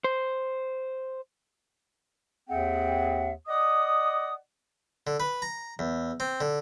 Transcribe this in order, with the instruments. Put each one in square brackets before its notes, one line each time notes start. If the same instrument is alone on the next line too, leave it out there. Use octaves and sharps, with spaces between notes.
[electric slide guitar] C5
[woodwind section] D#2 C4 G#4 E5 F#5 G5
D5 D#5 F#5 D#6
[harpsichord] D3
B4
A#5
E2
C4
D3